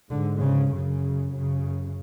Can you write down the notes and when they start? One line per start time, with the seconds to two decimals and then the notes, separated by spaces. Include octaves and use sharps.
0.11 G#2 D3
0.41 C#3
0.72 F#2 C#3
1.33 F#2 C#3